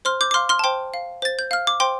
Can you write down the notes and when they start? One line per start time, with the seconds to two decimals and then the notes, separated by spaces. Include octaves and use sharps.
0.05 C5 C6 F6
0.21 D6 G6
0.31 D6
0.34 F5 C6 F6
0.49 C6 F6
0.59 A5
0.64 C5 G5 C6
0.94 F5
1.22 C5 A6
1.39 G6
1.51 F5 F6
1.67 D6
1.80 C5 G5 C6